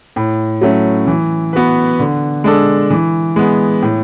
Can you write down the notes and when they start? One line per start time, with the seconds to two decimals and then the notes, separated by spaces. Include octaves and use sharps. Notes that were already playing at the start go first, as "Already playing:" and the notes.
0.16 A2
0.61 F#3 A3 C#4
1.07 E3
1.53 B3 F#4 B4
2.00 D3
2.44 G#3 D4 A4
2.90 E3
3.36 G#3 B3
3.82 A2